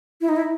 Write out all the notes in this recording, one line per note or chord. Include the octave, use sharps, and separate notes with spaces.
E4
D#4
E4